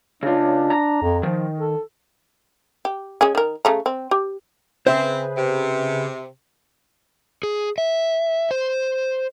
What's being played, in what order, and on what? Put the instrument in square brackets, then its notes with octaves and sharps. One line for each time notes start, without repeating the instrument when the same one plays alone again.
[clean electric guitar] C#3 F4 [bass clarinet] D4
[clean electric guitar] A#5
[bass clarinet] F2
[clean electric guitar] D#3 [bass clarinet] F3
[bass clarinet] A4
[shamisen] G4
G#3 C#4 G#4
D#3 A#4
C#3 A3 A#5
C4
G4
[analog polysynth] C#3 G#4 B4 [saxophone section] C4 [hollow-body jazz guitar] C5 E5
[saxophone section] C3
[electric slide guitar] G#4
E5
C5